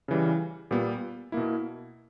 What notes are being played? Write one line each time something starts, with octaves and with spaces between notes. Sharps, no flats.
C#3 E3 G3
A#2 G3 B3
B2 A#3 E4